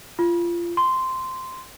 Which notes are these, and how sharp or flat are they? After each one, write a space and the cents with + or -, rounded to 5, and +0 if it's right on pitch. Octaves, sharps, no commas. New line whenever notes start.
F4 -25
C6 -10